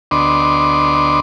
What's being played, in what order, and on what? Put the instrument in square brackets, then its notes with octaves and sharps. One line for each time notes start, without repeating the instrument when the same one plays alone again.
[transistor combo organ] D2 B3 D4 D#5 C6 D6